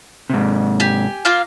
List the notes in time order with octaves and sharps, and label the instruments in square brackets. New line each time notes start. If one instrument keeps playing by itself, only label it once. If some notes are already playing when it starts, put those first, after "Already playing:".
[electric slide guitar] G#2 C3
[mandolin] G4 G#5
A#3 F4 F5